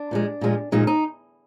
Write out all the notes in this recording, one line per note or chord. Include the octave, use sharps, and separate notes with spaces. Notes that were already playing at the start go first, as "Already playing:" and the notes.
Already playing: D4
A#2 F3 G#3
A#2 F3 G#3
A#2 F3 G#3 D#4
D#4